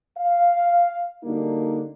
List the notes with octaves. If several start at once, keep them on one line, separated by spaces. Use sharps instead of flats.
F5
D3 G3 A#3 D4 D#4 F#4